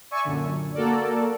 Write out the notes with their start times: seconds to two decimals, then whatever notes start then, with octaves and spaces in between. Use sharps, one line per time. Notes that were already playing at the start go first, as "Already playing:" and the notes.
0.11 D5 E5 G#5 C#6
0.25 F#2 A#2 D3
0.74 A#3 F#4 A4 A#4 D5